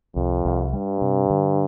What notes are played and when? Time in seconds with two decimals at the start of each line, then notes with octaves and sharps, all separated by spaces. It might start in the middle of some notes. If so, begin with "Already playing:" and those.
0.16 C2 F2
0.45 C2
0.73 G2 G3
1.01 C3
1.30 D3